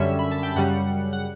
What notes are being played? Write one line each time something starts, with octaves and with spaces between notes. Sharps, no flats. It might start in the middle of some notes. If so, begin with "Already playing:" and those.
Already playing: F#2 D3 G3 C#4 E5
B5
A5
G5
F#2 C#3 G3 F#5
F#5